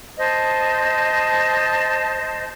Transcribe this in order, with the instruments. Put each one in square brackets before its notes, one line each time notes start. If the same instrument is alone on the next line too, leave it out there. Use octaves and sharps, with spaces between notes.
[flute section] C5 D#5 A5